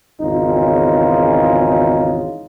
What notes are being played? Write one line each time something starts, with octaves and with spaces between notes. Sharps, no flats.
G#1 E2 C#3 D#4 F4